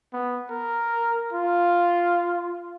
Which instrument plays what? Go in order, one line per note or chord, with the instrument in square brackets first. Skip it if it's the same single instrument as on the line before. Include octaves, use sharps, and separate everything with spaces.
[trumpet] B3
A#4
F4